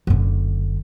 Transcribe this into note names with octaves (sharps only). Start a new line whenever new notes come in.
F#1 D3